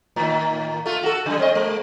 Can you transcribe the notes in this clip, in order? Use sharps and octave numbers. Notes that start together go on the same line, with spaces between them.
A2 D#3
A3 F4
F#4 A4
C#3 G3
C4 D#5
G#3